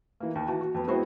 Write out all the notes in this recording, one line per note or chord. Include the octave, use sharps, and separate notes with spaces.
E3 A#3
D#2 A#3
E3 F#4 A5
F#4
F2 B3
G#3 B3 C4 E4 F#4 C5